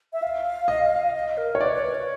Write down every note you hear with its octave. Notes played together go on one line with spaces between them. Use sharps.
E5
F5
D#5
D#5
A#4
C#5
B4 D5
B4
B4
C#5